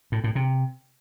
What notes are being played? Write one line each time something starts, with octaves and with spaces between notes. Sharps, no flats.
A2
A2
C3